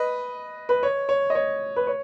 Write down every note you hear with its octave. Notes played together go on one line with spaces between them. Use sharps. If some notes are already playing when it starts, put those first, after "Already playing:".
Already playing: B4 D#5
B4
C#5
C#5
D#5
C#5
B4
C#5